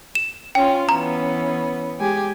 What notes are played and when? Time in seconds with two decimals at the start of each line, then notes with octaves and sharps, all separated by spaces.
0.15 E7
0.55 C#4 F4 G5
0.89 E3 B3 C#4 A#5
1.99 G#3 G4 G#5